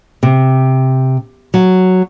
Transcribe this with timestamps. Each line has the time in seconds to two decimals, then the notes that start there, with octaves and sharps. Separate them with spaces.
0.23 C3
1.54 F#3